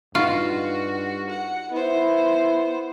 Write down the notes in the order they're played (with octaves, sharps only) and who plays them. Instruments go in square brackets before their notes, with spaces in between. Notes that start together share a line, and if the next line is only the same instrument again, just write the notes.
[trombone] G2 [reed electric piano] D#4 C#6 [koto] F4 [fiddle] F#4
[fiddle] F#5
[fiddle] B3 C5 [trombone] E4